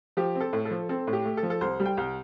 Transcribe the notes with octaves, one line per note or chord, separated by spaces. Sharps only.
F3 G4
C4
A4
A2
A4
F3
C4 A4
A2
G4
A3
A4
F3
A4
C2 C5
G3
G5
C2